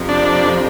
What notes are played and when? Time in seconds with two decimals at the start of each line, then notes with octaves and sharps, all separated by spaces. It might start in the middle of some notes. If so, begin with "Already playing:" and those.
Already playing: F2 C3 F3
0.09 D4